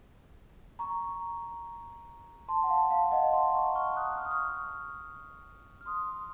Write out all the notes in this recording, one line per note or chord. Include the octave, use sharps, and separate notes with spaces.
A#5 C#6
A5 C6
F#5
F5 A5
F5 A5
D#5 F#5
A5 C6
A#5 C#6
C#6 F6
D#6 F#6
F6
D#6
C#6 F6
F6
C6 D#6